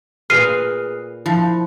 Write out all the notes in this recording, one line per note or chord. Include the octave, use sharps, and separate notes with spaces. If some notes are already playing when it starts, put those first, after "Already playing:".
A#2 G#4 B4 C6 F6 C7 D#7
F3 E4